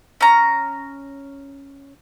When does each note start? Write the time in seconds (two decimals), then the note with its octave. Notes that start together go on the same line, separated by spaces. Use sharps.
0.21 C#4 A#5